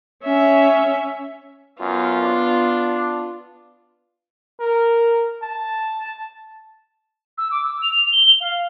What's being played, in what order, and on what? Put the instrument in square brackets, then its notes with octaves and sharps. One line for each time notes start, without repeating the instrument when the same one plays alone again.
[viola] C#4 E5
[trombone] F#2 [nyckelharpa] B3 F4
[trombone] D4
[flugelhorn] A#4
A5
[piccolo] E6
D6
E6
F7
G7
F5